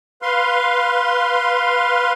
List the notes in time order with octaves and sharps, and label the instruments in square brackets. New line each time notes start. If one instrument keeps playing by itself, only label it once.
[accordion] B4 F5 C6